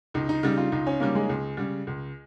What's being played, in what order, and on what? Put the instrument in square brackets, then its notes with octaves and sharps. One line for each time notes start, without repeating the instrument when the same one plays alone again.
[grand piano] C#2 [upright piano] D#4
[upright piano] D#4
[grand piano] C#3 G3 [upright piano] D#4
[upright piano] F4
[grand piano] C#2 [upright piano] D#4
[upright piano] C#4
[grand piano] C#3 G3 [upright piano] A#3
[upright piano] G#3
[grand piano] C#2
C#3 G3
C#2